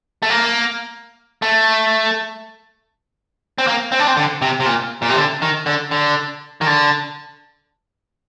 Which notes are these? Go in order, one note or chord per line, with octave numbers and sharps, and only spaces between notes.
A3
A#3
A3
C4
A#3
C4
D4
C4
D3
C3
C3
A#2
A#2
C3
D3
D#3
D3
D3
D#3
D3